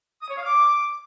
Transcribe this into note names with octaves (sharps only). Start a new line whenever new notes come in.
D#6
C#5
F5
D6